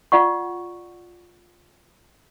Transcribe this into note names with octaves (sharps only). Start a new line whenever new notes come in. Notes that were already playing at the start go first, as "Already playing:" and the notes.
F4 D5 F#5 C#6